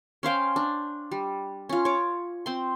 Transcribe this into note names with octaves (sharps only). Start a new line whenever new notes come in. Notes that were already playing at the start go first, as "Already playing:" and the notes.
C#4 C5 F5 G5
D4
G3
C#4 F4
C#5 D6
C4 C6